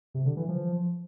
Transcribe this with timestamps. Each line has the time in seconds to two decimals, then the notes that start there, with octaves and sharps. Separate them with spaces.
0.15 C3
0.25 D3
0.36 E3
0.48 F3